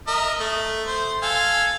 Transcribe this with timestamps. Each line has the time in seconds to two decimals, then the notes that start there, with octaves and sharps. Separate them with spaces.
0.08 A#4 D#5 E5
0.40 A3
0.87 C5
1.23 A4 F5 G#5